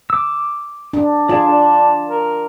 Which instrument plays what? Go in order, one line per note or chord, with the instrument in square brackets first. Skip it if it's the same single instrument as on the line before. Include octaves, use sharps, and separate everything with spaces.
[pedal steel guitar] D6 E6
[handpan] D4
[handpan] F4 [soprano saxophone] G#4 [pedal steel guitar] D5 A5
[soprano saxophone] D4
A#4